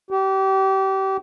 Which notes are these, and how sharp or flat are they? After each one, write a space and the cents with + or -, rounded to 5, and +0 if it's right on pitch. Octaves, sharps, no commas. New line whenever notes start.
G4 -30